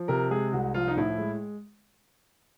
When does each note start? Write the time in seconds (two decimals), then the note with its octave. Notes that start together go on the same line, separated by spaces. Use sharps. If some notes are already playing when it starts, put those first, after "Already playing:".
Already playing: F3
0.08 C3 A#4
0.30 G#3 G#4
0.53 C2 F#4
0.74 F3 F4
0.88 D#4
0.97 A2 E4
1.18 G#3